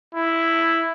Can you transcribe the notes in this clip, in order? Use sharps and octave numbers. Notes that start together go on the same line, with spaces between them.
E4